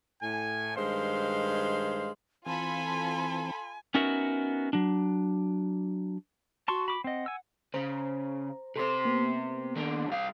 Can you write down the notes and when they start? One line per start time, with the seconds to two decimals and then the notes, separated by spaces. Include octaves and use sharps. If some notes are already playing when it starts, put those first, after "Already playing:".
0.22 A2 G#5
0.76 G2 D#3 G#3 C5 F5 C6
2.46 E3 C4 F4 A4 G#5 B5 C6
3.94 B3 C#4 D#4 F#4 A#4 E5
4.73 F#3 D4
6.68 F#4 A5 C6 C#6
6.88 B5 D6
7.04 C4 D#5 F#5
7.26 G#5 E6
7.74 C#3 C5 A#5
8.76 C3 A4 C5 C6
9.05 A#3 B3
9.76 D#3 D4
10.08 C2 F5